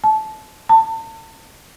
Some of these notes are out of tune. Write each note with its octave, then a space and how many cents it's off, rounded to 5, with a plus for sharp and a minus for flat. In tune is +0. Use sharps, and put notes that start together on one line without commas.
A5 -25
A5 +35